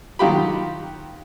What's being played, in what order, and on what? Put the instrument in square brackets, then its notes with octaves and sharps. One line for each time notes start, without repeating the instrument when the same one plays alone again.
[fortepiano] D#3 F#3 F4 G4 B5